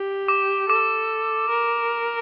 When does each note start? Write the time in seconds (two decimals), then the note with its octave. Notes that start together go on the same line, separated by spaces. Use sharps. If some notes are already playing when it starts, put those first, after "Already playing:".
Already playing: G4
0.28 D6
0.69 A4 D6
1.50 A#4